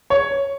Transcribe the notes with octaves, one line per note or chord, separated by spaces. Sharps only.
C#5